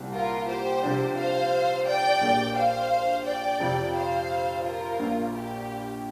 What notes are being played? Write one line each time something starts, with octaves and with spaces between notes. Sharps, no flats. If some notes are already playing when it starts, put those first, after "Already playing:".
Already playing: C2 A#2 G3 C4
F4 A#4
G4 C5
C3 F3 D4
C5 F5
D5 G5
A#1 A#2 A#3 G4 A#4
C5 F5
D5 G5
F2 C3 F3
C5 F5
F4 A#4
A#1 A#2 A#3
G4